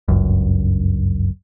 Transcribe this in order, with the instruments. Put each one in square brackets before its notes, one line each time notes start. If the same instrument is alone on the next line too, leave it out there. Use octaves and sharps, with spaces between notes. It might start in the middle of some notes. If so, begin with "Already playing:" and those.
[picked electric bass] G1 C#2 F#2